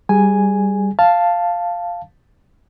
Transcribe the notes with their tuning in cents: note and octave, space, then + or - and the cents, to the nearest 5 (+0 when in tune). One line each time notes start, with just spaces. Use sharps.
G3 +0 G#4 +5 G#5 +0
F5 +0 A5 +0